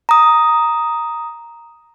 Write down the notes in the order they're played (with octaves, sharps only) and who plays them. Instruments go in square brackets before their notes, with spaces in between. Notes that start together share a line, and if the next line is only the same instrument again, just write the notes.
[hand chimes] A#5 D#6